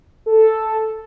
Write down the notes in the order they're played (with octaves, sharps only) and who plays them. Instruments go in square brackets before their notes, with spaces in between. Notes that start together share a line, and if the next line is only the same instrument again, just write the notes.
[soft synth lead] A4